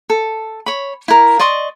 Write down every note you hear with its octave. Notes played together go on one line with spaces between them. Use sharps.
A4
C#5 B5
E4 A#4
D5 D#5 C6 C#6